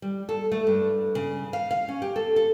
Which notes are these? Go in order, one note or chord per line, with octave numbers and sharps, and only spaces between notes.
G3
A4
A3
G2
C#3
F5
F5
C#4
G4
A4
A4